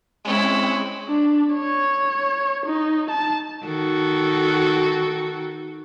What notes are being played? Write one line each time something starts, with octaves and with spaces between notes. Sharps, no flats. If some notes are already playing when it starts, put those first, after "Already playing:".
G#3 C4 C#4 E4
D4
C#5
D#4
A5
D#3 F#4 A4